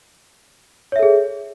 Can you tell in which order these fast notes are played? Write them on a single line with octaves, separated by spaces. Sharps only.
C#5 E5 A4 G#4